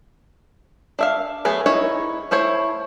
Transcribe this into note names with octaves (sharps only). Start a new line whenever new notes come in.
D4 E5 F5
F#3 A3 B3 G#4
D#4 E4 C#5
A3 E4 C5 C#5